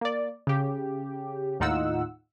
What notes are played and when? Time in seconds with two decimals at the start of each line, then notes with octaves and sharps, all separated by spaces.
0.01 A#3 D5
0.47 C#3 G4
1.60 D#2 A2 D#4 F4 F#5 E6